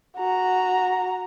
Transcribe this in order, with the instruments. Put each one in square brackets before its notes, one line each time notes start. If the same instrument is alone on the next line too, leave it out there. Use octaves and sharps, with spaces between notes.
[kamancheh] F#4 A#5